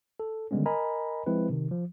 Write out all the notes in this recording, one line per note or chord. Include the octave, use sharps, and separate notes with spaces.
A4
D3 D#3 G3 G#3 B3 C#4
A#4 D#5 G#5 A#5 B5
F3 G#3 C4 E4 B4
C3 D#3
F3